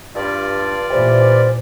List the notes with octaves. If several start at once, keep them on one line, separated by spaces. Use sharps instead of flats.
G2 F4 D5
A#2 E3 G3 C5